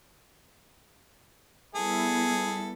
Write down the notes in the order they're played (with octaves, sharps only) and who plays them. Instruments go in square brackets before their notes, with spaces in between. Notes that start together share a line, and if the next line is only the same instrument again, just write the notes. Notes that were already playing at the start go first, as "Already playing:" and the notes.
[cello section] G3 B3 E4 [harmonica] G#4 A4